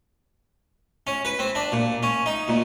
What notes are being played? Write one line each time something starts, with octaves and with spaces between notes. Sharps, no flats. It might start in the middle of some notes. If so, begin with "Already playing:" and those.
C#4
B4
C4
D4
A#2
C#4
D#4
A#2